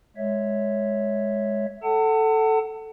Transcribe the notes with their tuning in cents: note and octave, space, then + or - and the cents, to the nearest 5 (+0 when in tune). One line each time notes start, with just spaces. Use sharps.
G#3 +0 C#5 +0 E5 -5
A4 +0 F#5 +25 A5 +35